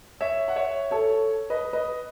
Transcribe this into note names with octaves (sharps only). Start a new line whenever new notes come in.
C#5 E5
F#5
C#5 E5
A4 C#5
B4 D#5
B4 D#5